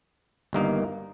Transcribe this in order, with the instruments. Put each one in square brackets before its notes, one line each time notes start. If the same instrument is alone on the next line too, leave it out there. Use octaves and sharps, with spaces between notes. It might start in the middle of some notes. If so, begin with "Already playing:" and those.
[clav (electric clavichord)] G1 G2 D#3 A#3 D#4